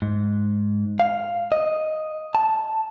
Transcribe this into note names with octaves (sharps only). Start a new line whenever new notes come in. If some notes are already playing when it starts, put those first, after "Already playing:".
G#2
F5
D#5
A5